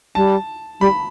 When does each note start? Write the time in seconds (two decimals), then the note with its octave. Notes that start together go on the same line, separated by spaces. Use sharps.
0.15 G3 A5
0.80 G3 B5